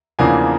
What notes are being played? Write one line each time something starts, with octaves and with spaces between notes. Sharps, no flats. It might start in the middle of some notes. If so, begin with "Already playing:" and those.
E2 C#3 F3 A#3 D4 G#5 A#5